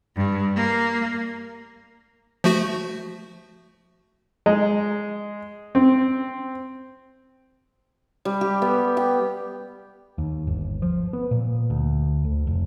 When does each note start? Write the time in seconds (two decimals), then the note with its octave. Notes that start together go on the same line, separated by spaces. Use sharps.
0.17 G2
0.57 A#3
2.44 F3 A3 F#4
4.46 G#3
5.75 C4
8.25 G3
8.41 G4
8.62 B3
8.97 G5
10.18 D#2
10.47 G1
10.82 F3
11.13 B3
11.31 A#2
11.70 D2
12.24 D2
12.47 F1